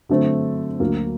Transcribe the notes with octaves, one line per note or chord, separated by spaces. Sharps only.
D3 F#3 A3 C4
D2 D3 F#3 A#3